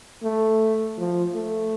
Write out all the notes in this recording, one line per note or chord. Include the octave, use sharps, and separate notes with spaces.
A3
F3
A3